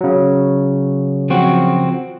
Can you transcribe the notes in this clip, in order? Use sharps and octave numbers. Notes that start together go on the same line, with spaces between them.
C#3 F#3
F3 C4 F#4